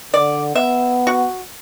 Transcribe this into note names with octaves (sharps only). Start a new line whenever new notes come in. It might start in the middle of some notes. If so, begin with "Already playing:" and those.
D3 D5
B3 E5
F#4